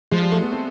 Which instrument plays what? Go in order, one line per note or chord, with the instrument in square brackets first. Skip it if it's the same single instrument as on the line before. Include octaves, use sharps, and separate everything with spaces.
[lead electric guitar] F3 [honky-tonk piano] G#3
[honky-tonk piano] G3
A3
B3
C4